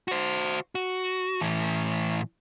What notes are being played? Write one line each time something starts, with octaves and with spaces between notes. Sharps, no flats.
F#4 C5
F#4
A2 E3